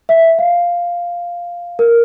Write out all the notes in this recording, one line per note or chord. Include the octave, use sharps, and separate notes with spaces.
E5
F5
A#4